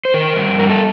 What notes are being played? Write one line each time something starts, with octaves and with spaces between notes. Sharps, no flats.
C5
D#3 A#4
G2
G3 A#4
A4